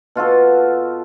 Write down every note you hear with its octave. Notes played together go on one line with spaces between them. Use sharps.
B2 F4 F#4 A4